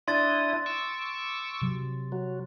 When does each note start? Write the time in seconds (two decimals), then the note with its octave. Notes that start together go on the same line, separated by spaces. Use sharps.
0.08 D4 E4 C6 D#6 A6
0.66 C#6 D6 E6
1.62 C3 F#3
2.12 F#3